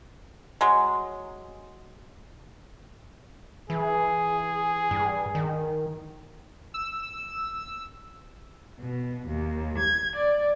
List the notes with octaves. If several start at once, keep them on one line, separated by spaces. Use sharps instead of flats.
F#3 G#3
E3 G#4
G2
D#3
E6
B2
D#2
G#6
D5